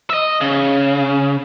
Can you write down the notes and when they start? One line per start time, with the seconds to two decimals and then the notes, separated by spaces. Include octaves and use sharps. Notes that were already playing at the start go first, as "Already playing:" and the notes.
0.10 D#5 E5
0.41 C#3